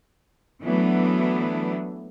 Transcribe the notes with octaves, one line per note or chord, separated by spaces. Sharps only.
E3 F#3 A3 B3 D4